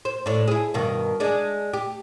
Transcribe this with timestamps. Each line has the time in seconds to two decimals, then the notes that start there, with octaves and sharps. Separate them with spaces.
0.05 C5
0.26 A2 D4
0.48 E4 G#4
0.74 G2 B2 D#3
1.20 G#3 D4
1.73 G4